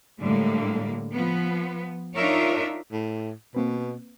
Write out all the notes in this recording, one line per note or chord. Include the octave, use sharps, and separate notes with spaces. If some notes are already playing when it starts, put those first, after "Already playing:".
A2 D3 G3 G#3 A#3
F3 B3
D4 D#4 F4 A#4 C#5 E5
A2
B2 A#3 C4 B4